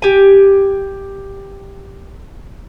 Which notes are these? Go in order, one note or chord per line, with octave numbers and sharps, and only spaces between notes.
G4 G#5